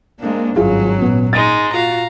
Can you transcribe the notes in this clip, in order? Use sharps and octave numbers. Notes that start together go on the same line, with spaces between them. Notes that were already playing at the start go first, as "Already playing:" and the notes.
G#3 A#3 C4 D4
G#1 G2 F#3 C#4 F4 G#4
A#2 B3
G#3 D#4 A6
F4 F#4 F5 A#5